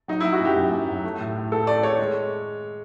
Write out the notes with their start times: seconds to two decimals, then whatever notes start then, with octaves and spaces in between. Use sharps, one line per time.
0.08 F#3 D#4
0.20 F#3 E4
0.32 F#4
0.41 F#2 G4
0.56 F#2
0.72 F#2
0.88 F#3
1.04 A3
1.19 A2
1.35 A2
1.52 A2 A4
1.67 A3 D5
1.83 A3 C#5
1.99 G#3